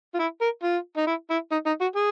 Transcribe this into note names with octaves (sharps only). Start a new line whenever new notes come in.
F4
E4
A#4
F4
D#4
E4
E4
D#4
D#4
F#4
G#4